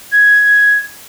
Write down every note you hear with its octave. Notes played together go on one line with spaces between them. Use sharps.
G#6